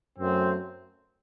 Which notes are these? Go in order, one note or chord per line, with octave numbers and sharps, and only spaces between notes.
F#2 F#3 A3 C4